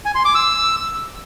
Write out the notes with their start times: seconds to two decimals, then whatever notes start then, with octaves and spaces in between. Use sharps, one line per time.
0.05 G#5
0.15 C6
0.25 D6
0.35 E6